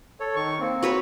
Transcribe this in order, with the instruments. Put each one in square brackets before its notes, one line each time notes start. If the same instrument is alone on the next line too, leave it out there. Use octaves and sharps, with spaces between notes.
[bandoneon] A4 C#5
D#3 C#6
A#3 C4
[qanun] F#4 B4 C#5